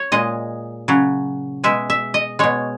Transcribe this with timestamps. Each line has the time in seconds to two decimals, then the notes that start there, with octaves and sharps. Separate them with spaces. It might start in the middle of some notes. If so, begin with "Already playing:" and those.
Already playing: C#5
0.12 A#2 G#3 D#5
0.88 C#3 F#3
1.64 B2 G#3 E5
1.90 E5
2.14 D#5
2.39 B2 G#3 C#5